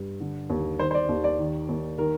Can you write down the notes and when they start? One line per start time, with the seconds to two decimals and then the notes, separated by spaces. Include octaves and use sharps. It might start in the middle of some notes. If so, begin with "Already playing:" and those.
Already playing: G2
0.20 D3
0.50 D#2
0.79 D#3 C5
0.91 C5
0.94 D5
1.09 D#2
1.24 D5
1.39 D#3
1.69 D#2
1.98 D#3 A#4